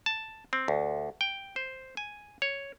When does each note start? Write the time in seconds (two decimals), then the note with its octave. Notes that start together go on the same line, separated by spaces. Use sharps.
0.06 A5
0.53 C4
0.68 D2
1.21 G5
1.56 C5
1.97 G#5
2.42 C#5